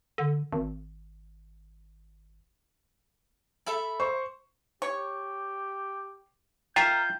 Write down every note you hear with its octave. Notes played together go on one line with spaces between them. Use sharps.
D3
G#1
A4 E5 B5
C5 C#6
G4 C#5
F4 A#4 E5 G5 G6